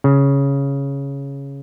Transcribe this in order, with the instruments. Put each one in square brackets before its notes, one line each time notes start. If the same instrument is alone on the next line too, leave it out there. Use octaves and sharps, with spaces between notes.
[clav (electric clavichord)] C#3